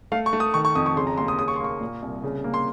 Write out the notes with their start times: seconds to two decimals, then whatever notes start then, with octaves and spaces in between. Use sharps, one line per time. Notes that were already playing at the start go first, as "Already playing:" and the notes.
0.12 A3 F5
0.26 C#6
0.33 A3
0.40 D#6
0.54 D#3 C#6
0.65 C#6
0.75 F2 D#6
0.86 C#6
0.96 C#3 C6
1.07 A#5
1.17 D#2 C6
1.28 D#6
1.39 C#3 D#6
1.48 C#6
1.56 C6
1.60 A#3 C#6
1.81 A#2
2.02 C2
2.24 C#3
2.44 A#3
2.54 C6